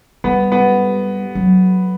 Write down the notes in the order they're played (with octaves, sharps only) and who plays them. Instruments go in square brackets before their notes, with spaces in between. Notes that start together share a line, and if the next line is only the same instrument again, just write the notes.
[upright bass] G3 [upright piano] B3
[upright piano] B3
[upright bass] F#3